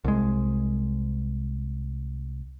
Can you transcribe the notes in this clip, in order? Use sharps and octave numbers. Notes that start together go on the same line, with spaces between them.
C2 G#3